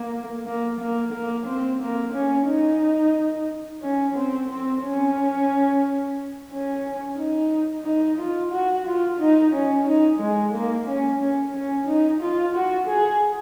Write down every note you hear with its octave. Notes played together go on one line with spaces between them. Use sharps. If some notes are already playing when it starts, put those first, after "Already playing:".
Already playing: A#3
A#3
A#3
A#3
C4
A#3
C#4
D#4
C#4
C4
C4
C#4
C#4
D#4
D#4
F4
F#4
F4
D#4
C#4
D#4
G#3
A#3
C#4
C#4
C#4
D#4
F4
F#4
G#4